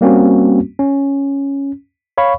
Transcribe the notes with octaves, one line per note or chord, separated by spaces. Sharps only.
G3 A#3 C4 C#4 F#4
C#4
C#5 F5 B5 C#6